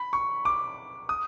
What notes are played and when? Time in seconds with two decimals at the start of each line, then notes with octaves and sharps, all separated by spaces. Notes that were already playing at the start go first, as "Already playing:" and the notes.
Already playing: B5
0.13 C#6
0.45 D6
1.09 D#6